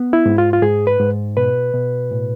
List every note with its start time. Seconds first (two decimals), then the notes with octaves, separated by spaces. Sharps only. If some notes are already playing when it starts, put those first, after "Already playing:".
Already playing: B3
0.13 E4
0.26 G#2
0.38 F4
0.53 F4
0.62 G#2 G#4
0.87 B4
1.00 G#2
1.37 B2 B4
1.73 B2
2.11 A2